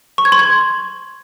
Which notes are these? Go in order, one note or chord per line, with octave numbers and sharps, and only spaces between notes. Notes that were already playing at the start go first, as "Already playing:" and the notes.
C#6
G#6
C6
G#6